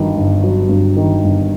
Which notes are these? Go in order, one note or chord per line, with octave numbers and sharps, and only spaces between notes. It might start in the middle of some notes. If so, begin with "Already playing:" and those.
Already playing: G1 G2 D#3 F#3
G1
F#3
G2
D#3
G1